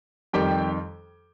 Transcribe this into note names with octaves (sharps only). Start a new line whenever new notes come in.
F2 D#3 G3 G4 G5